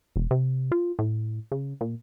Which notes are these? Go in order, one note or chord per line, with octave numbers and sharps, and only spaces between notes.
E1
C3
F4
A2
C#3
A#2